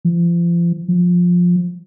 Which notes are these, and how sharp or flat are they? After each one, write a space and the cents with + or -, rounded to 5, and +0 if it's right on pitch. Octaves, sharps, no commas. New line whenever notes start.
F3 -35
F3 +15